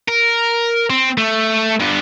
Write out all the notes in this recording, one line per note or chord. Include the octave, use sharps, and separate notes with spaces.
A#4
C4
A3
G2 B3